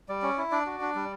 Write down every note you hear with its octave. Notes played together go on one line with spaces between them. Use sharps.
G3 D5
C#4
E4
D4 D5
F#4
D4
G3